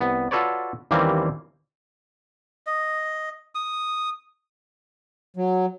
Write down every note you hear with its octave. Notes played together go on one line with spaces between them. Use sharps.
C2 B3
F4 F#4 A4 B4 C#5 D5
D#2 E3 G3 A#3 C4 C#4
D#5
D#6
F#3